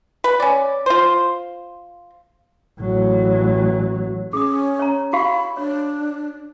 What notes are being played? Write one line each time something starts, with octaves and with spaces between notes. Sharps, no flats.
B4
C#4 D5
F4 C5
A1 F#3
C#4 G#4 D#6
C#5 A#5
F#4 G4 F5 B5
D4 C#5